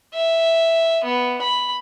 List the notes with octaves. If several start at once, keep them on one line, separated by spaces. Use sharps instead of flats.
E5
B3
B5